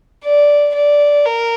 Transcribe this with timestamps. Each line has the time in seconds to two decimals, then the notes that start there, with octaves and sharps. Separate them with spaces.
0.24 D5
0.75 D5
1.25 A#4